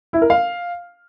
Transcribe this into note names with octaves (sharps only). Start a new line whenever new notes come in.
E4
A#4
F5